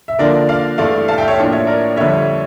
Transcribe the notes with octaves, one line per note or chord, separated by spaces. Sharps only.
E5
D3 F3 A#3 D4 A#4 D5
D5 F5
G2 E3 A3 D5 F5
F5 A5
E5 G5
C#5 E5
A2 F3 A#3 D4
C#5 E5
A#4 D5
F2 D3 G3 C#5 E5